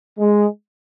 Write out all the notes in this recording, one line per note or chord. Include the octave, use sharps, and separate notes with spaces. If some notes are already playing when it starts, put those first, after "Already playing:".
G#3